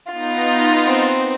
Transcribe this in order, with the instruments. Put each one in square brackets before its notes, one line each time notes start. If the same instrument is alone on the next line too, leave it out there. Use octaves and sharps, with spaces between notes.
[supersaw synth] B3 D#4 A#6 [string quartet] F4
[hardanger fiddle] C4